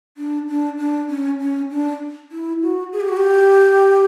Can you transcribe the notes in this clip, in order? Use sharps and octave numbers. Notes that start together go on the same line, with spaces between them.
D4
D4
D4
C#4
C#4
D4
E4
F#4
G#4
G4
F#4
G4